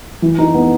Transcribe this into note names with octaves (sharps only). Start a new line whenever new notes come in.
E3
D#4
B3